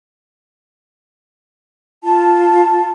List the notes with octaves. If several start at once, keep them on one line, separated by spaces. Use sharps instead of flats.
F4 A5